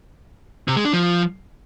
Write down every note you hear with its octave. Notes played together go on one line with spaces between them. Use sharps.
C3
G#3
D4
F3